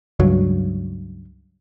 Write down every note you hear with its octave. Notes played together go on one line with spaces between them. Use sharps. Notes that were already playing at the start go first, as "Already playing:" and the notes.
C#2 G2 F#3